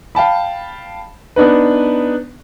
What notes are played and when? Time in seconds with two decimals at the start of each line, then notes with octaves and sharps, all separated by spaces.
0.15 F5 G5 A5 B5
1.36 B3 D4 D#4 B4